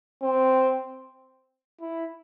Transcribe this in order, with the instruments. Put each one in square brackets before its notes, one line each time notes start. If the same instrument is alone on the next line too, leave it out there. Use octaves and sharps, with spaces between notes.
[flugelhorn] C4
E4